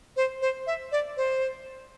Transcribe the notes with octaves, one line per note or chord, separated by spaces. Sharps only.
C5
C5
E5
D5
C5